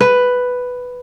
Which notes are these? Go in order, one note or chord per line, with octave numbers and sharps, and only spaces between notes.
B4